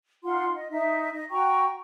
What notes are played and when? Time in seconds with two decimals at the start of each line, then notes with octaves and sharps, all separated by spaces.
0.24 D#4 F4 F#5 C6
0.55 D#5
0.71 D#4 E5
1.14 D#5
1.30 F#4 G5 A#5 C#6